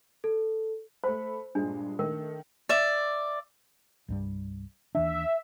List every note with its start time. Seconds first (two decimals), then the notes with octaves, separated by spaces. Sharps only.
0.24 A4
1.04 A3 C5 B5
1.55 G2 A#2 G#3 D4
1.99 D#3 A3 A#4
2.69 D5 E5
4.08 C2 G2 G3
4.95 D#2 E3 D4 E5